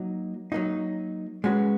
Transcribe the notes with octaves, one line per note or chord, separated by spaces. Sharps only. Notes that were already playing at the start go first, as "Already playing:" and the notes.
Already playing: F#3 A#3 D#4
F#3 A#3 D#4
G#3 C#4 F#4 B4